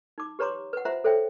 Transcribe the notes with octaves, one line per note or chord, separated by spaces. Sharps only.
D#4 D6
G4 B4 C#5 A#5 C6 D6
B4 F#5
F4 C5 E5 F#5 A#5
A4 C5 C#5 E5 G5